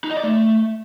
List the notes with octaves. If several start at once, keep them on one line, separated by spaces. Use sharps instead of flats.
D#4
D#5
D5
A3